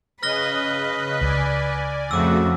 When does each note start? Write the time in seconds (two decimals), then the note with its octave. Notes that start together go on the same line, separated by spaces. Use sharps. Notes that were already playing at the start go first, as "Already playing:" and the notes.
0.23 C#3 B4 D#5 F6 F#6 A#6 G7
1.21 C#2 D5 G#5
2.11 F2 C#3 A3 F#4 D6 E6